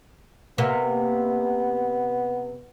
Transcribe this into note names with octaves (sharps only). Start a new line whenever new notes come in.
C3 A#3 B3